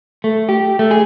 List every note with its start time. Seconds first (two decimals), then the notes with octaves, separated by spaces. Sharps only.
0.24 A3
0.49 G4
0.79 A3
0.91 G#4